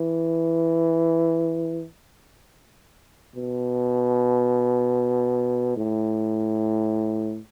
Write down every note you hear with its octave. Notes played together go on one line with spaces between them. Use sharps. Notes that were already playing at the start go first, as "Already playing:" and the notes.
Already playing: E3
B2
A2